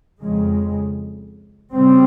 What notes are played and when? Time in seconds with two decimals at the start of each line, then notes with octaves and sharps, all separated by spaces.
0.20 F2 C#3 G#3
1.73 C#3 G3 C4